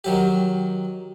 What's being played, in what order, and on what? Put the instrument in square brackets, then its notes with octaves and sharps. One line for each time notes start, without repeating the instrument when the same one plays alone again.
[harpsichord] D#3 F#3 G4